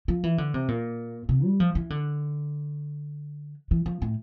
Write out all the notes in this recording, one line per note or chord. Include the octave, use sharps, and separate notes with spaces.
F3
E3
D3
C3
A#2
C3
G3
F3
E3
D3
E3
F3
A2